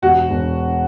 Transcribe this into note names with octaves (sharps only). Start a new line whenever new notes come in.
E1 F#4
E1